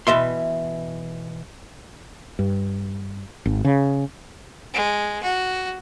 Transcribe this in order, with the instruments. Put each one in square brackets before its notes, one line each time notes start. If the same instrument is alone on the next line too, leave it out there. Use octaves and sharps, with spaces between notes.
[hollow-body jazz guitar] B2 E3 E5 C6
[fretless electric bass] G2
G#1
C#3
[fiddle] G#3
F#4